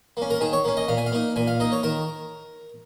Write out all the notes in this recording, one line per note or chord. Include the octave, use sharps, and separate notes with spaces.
A#3 C#4
A#4
D#3 G#4
C#5
A#3 C#4
D#5
A#2 F5
G#5
F5
A#3 D#4
A#2 G#5
F5
A#3 D#4 D#5
C#5
D#3 A#4